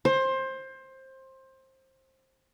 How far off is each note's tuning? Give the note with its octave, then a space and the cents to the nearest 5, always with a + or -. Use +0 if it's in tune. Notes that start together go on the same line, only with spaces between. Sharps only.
C5 +20